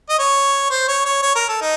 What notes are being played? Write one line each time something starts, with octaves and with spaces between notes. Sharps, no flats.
D#5
C#5
C5
C#5
C#5
C#5
A#4
A4
D#4